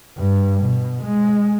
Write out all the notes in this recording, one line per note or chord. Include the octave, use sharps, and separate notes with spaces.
G2
B2
G#3